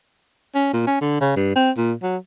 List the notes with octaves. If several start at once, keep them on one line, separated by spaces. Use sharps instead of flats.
C#4
A#2
C#4
D3
C#3
G2
C4
A#2
F#3